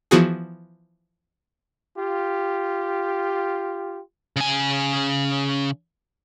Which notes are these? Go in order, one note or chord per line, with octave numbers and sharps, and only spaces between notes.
E3 F3 B3 F#4 G#4
F4 G4
C#3 G#5